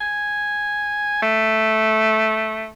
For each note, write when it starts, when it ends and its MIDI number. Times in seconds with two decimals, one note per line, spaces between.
0.01 1.20 80
1.22 2.69 57